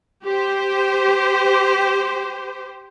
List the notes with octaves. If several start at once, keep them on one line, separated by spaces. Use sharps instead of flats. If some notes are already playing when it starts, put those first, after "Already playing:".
G4 C5